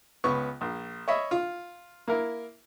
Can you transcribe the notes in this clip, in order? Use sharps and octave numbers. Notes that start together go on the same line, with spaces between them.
C#2 B3 C#6
A#1
C#5 D#5 E5 B5
F4
A#3 E4 A#4